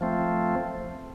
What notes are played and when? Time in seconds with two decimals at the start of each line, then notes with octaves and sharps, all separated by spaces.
0.01 F3 A3 C4